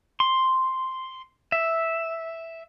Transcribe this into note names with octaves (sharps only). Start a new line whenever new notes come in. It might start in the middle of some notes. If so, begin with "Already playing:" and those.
C6
E5